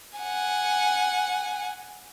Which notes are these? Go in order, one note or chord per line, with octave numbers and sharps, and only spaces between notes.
F#5 G#5